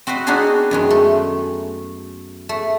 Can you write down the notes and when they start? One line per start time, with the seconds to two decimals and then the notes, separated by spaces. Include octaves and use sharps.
0.07 C4 F#4 B4 C5 D#5
0.27 B3 C4 D4 D#4 F#4 G#4
0.71 F#2 D#3 G#3
0.90 A3
2.49 A3